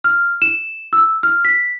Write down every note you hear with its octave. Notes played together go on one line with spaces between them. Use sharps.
F6
E7
E6
F6
B6